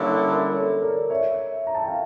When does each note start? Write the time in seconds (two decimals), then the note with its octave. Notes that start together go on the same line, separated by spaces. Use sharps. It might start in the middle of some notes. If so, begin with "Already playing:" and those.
Already playing: D3 G3 A#3 C#4 E4
0.26 A#4
0.53 A4 C#5
0.82 A#4 D5
1.10 C#5 E5
1.67 A#5
1.75 A5
1.82 G5
1.88 F5